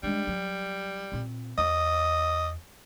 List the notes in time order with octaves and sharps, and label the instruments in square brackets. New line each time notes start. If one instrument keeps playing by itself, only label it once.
[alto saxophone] G3 [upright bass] G#3 D4
[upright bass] F#3
A#2 C4
[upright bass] E2 [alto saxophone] D#5